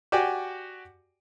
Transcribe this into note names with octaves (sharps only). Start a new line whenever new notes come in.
F#4 G4 D5 G5 G#5